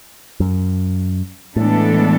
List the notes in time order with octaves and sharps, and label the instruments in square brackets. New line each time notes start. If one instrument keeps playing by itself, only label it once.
[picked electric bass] F#2
[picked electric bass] A2 [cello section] E3 G#3 B3 D4 A4